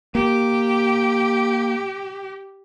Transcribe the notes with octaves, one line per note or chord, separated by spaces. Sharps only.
A#3 G4